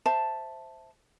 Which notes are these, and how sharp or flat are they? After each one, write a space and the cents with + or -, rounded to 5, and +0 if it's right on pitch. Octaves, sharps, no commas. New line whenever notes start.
C5 +0 E5 +0 A5 +0